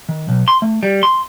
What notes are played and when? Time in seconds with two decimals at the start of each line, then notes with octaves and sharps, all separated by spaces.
0.09 D#3
0.29 B1
0.48 C6
0.62 A3
0.83 G3
1.03 C6